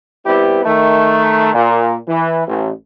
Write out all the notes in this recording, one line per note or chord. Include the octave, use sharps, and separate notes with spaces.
G3 B3 C4 E4 G4
D#3 A3
A#2
E3
A1